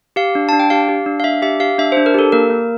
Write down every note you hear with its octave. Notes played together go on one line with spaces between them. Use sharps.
G4 F5
D4
D4 A5
G5
G4 F5
G4
D4
F5
D4 E5
G4 E5
G4 F5
D4 E5
D4 C5
A#4
G4 A4
A#3 A#4
A#3